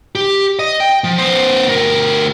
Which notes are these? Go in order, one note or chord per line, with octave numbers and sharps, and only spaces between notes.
G4
D#5
G5
F3
B3 C5
D2 A#4